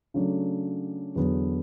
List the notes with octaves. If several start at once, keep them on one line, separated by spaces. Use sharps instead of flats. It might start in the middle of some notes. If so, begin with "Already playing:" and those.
C#3 F#3 A3 D4
E2 D3 F#3 B3 D4